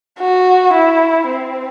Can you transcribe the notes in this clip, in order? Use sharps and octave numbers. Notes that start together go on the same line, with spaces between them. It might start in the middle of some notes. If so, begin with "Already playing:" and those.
F#4
E4
C4